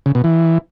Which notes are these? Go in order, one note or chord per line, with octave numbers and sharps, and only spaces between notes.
C#3
B2
E3